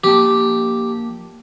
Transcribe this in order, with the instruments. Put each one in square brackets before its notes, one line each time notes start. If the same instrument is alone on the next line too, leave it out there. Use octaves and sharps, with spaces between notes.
[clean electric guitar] F3 A#3 A5 [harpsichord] G4